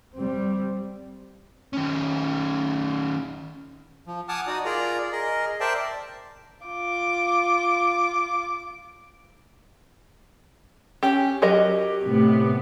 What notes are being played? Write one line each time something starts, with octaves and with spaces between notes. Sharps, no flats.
G3 C4
D#3 C#4
F3
F#5 G#5 A5 D6 D#6 F6
D#4 F#4 D5 D#6
F4 G#4 A#4 D5 A#5
G#4 A#4 D#5
A#4 C5 D5 E5 G5 A5
F4 D6
C#4 G4
F#3 G4 A#4 D#5
A2 C3 B3